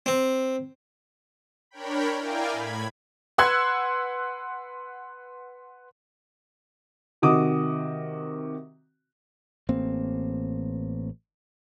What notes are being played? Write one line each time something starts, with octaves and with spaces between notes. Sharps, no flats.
C4
D4 A#4 C#5 G5 B5
E4 A#4 D5 F5 G5 G#5
A2 B5 G#6
B4 F#5 C6 E6 F#6 G#6
C3 D#3 F#4 D6 D#6
A1 A#3 C4